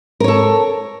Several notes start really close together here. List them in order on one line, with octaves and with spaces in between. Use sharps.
A#4 C#5 A4